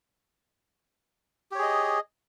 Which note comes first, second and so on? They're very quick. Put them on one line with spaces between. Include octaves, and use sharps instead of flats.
G4 C#5 G#4 D#5